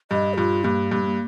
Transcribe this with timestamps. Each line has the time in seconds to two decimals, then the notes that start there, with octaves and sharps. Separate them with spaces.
0.11 G2 D#5
0.34 G4
0.37 G2 F4
0.64 G2 A#3
0.91 G2
1.05 A#3